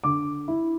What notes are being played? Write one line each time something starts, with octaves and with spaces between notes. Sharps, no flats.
D3 D6
E4